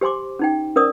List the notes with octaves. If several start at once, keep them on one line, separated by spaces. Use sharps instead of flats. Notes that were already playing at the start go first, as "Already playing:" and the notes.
G4 C5 G#5 C6 D6
C#4 D#4 G5
C#4 A#4 C5 D5 D#6